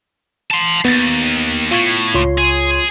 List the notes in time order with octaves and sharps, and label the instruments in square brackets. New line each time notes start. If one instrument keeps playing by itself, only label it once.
[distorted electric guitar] A5 C6
[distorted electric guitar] D#2 [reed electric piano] B3 A6
[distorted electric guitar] A2 [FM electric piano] F4 C#6 G#6
[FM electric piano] C#2 C#5 C6 [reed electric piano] F4
[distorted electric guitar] G#4